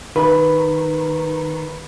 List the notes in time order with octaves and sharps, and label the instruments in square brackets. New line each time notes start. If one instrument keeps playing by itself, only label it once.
[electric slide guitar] D#3 [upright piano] B4 B5